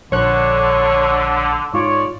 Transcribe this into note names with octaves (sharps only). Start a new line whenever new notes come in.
A#1 D3 C#5 F#6
G#2 F4 C#5 D5